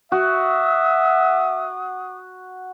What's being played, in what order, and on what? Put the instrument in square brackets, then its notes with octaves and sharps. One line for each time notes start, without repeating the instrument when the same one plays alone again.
[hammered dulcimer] F#4 [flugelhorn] E5 [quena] D#6